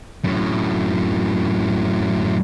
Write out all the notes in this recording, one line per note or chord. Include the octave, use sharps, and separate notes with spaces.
F#2 A2